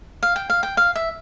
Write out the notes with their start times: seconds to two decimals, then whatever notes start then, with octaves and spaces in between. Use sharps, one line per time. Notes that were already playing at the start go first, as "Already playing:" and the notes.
0.23 F5
0.36 G5
0.50 F5
0.63 G5
0.77 F5
0.96 E5